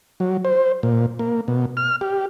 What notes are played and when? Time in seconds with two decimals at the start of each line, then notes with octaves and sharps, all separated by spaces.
0.20 F#3
0.45 C5
0.83 A#2
1.19 A#3
1.48 B2
1.77 F6
2.01 G4